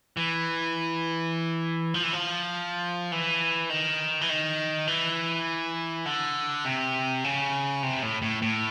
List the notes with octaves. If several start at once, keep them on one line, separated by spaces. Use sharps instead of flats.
E3
F3
E3
F3
E3
D#3
E3
D#3
E3
D3
C3
C#3
C3
A2
A2
A2